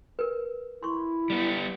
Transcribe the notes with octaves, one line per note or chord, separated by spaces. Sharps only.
A#4 B4
E4 C6 C#6
G3 B3